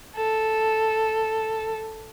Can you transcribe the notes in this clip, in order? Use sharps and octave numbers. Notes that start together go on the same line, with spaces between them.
A4